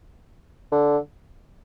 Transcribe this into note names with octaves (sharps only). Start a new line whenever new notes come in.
D3